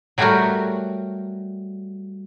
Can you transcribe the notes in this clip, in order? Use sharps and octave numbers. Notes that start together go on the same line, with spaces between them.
F#3 G3 A3 F#4 G4 A#4